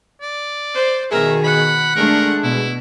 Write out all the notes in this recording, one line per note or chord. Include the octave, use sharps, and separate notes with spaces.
D5
C5
B2 D#3 G#4 A#4 E5
F#5 B5
G#3 A3 D4 A#4
B2 E4